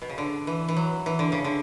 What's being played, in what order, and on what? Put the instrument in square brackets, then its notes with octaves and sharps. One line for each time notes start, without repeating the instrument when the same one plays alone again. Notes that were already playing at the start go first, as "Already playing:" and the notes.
[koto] B2
C#3
D3
E3
E3
F#3
E3
D3
C#3
D3